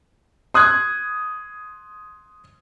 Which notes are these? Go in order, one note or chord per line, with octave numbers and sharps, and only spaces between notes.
C6 D#6 F#6 G#6